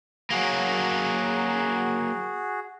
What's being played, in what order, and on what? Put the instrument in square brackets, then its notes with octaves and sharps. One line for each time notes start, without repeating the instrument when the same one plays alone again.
[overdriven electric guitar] F#3 A#3 [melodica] F#4 G#4